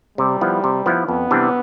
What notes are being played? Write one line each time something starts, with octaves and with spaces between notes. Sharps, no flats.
C3 G3
F3 B3 E4
C3
F3 B3 E4
F2 B3
C3 E3 G3 D4